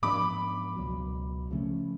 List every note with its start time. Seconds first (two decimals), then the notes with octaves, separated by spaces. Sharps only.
0.02 G#2 F3 B3 D4 B5 D6
0.76 C#2 B2 F#3
1.51 C#3 F3 A3 C#4